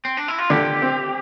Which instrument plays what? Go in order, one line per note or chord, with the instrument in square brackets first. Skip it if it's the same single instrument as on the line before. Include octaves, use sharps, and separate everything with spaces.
[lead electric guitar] C4
D4
E4
F4
[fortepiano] D3 [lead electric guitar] G4
[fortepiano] C4